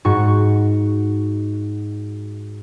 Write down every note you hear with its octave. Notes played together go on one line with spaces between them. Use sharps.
G#2 F#4 C#6